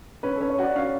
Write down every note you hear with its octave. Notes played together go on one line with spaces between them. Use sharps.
C#4 B4
C#4 A4
C#5
F#4 D5
C#4 F5